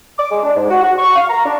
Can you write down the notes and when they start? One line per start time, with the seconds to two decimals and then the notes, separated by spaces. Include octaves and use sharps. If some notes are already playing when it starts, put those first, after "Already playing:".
0.19 D6
0.31 G#3
0.43 D4
0.56 G#2
0.70 F#4
0.82 F#4
0.98 C#6
1.16 F5
1.30 A#5
1.46 D4